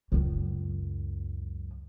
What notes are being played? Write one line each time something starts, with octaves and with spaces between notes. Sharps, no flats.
C#2 F#2